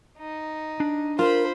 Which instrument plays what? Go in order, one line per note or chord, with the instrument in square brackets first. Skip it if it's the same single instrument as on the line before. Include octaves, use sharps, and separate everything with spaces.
[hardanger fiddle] D#4
[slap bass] D4
[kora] F4 [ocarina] A#4 [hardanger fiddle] C5 B5